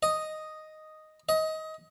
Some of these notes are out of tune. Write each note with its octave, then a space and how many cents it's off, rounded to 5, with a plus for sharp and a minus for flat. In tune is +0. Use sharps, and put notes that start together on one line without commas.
D#5 +0
D#5 +25